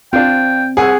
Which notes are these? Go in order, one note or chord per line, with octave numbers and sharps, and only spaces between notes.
C4 D4 F4 G5
C2 G#4 F#5 G#5 E6